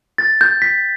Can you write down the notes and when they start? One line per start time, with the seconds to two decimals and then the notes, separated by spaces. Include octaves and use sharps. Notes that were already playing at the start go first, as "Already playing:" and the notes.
0.18 A6
0.41 G6
0.62 B6